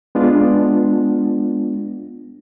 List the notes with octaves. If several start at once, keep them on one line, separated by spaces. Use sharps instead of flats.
G#3 B3 D4 F4